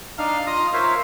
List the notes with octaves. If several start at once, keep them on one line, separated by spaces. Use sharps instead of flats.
D4 D#4 F5 F6
F4 D#5 A#5 D#6 F6
F4 A#4 C5 C#5 E5 F5